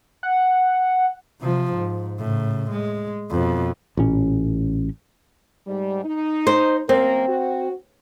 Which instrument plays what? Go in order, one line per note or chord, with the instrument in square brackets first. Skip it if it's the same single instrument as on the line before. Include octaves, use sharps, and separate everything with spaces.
[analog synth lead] F#5
[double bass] C3 F3
G#2
A2 C#3
G#3
F2 B2
[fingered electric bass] A1 A#2 C#4
[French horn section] G#2 G3
D#4
[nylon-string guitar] C5
[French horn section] F#2 A#3 A#4 [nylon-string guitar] C4
[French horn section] F#4